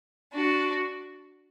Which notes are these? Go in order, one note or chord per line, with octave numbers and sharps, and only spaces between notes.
D4 F#4